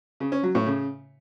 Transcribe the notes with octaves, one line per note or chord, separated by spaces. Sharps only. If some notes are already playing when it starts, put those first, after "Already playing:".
C#3
C#4
F#3
A2
C#3